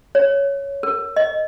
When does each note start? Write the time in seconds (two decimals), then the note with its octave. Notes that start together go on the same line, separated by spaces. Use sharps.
0.15 C#5
0.83 A#4
1.16 D#5